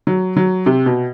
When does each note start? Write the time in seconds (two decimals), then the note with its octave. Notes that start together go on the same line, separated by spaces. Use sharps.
0.07 F#3
0.36 F#3
0.66 C3
0.86 B2